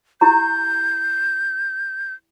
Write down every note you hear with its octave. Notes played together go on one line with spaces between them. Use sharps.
E4 G4 A#5 G6